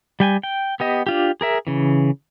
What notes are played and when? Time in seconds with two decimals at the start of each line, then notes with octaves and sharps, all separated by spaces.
0.20 G3 G5 G#5
0.43 G5
0.80 B3 G4 D#5
1.07 D4 F4 G4
1.41 G#4 A#4 E5
1.67 C#3 E3